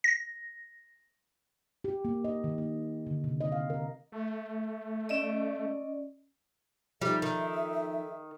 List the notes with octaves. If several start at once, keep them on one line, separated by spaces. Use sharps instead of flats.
A#6
G4
A#3
D#5
D#3
A#3
D3
C3
D#5
F5
A#4
A3
C#4 D5 D#5
F3 G3 D#4 A4 E5
D#3